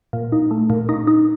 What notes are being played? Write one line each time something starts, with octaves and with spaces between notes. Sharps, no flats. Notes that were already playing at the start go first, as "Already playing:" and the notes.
A#2
D#4
A3
A#2
D#4
D#4